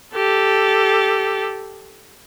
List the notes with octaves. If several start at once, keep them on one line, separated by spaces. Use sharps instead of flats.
G4 A4